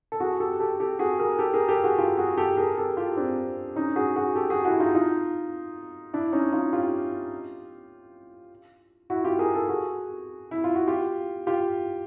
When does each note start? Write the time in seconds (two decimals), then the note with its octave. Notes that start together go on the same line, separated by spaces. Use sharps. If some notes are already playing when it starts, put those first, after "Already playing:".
0.12 A4
0.20 F#4 G#4
0.40 G4 A4
0.60 G4 A4
0.80 G4 A4
0.99 F#4 G#4
1.19 G#4 A#4
1.39 G4 A4
1.54 G#4 A#4
1.69 G4 A4
1.83 F#4 G#4
1.98 F4 G4
2.18 F#4 G#4
2.38 G4 A4
2.57 G#4 A#4
2.77 G4 A4
2.97 F4 G4
3.17 C4 D4
3.76 C#4 D#4
3.96 F#4 G#4
4.16 F#4 G#4
4.35 G4 A4
4.50 F#4 G#4
4.65 E4 F#4
4.80 D#4 F4
4.95 D#4 F4
6.14 D4 E4
6.33 C#4 D#4
6.53 D#4 F4
6.73 F4 G4
9.10 E4 F#4
9.24 F4 G4
9.39 G#4 A#4
9.54 G4 A4
9.69 F#4 G#4
10.51 E4
10.64 F4
10.75 F#4
10.87 F4 G4
11.47 F4 G4